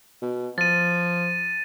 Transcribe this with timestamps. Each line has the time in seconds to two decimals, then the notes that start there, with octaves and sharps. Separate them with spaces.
0.22 B2
0.58 F3 A6 D#7